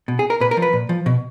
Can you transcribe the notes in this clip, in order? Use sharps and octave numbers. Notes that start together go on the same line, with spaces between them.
B2
G#4
A#4
A#2 B4
A#4
F3
B4
A#2
F3
B2